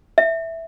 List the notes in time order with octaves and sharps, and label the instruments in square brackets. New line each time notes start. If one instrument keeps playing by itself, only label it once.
[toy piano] E5